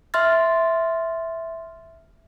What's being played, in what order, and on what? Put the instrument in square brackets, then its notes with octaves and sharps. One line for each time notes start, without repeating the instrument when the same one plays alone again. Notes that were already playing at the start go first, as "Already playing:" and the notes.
[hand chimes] E5 C6 F6 A6